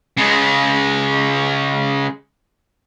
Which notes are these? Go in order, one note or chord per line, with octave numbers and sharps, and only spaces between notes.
C#3 G#3